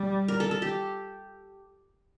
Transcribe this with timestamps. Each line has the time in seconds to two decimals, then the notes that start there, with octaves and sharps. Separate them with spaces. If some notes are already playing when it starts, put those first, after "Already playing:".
Already playing: G3
0.28 A#4
0.40 A4
0.51 A4
0.62 G4